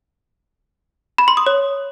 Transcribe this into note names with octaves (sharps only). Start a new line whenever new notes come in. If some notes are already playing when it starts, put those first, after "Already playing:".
B5
C6
D#6
C#5